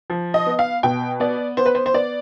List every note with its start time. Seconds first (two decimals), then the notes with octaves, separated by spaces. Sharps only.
0.10 F3
0.34 D#5
0.46 B3
0.59 F5
0.83 B2 G5
1.20 B3 D5
1.57 B3 C5
1.66 B4
1.75 C5
1.86 C5
1.94 B3 D5